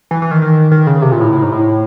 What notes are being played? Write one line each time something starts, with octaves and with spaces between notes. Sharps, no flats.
E3
E3
D#3
D#3
D#3
C#3
C3
A#2
A2
A2
G#2
A2